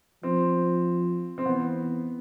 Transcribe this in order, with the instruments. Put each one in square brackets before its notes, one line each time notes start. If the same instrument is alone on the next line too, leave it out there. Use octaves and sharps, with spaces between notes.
[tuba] F3 [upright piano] C4
[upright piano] C4
[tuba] E3 [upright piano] B3